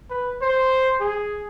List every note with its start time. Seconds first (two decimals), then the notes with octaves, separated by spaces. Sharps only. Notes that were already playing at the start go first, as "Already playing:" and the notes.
0.10 B4
0.42 C5
1.01 G#4